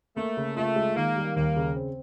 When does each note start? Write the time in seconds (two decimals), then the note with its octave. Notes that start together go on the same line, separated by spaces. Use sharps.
0.16 A3 A#3
0.37 C#3
0.56 A3 F4
0.76 G#3
0.96 D#3 A#3
1.16 G3
1.36 D#2 A#3
1.56 C#3
1.76 C4